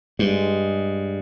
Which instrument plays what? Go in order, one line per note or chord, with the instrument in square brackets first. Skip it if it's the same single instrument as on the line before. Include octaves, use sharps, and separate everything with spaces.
[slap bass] G2 [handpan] G3 G#3